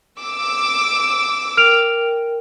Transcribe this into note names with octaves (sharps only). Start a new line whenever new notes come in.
D6 E6
A#4 G5 F6 D7 F7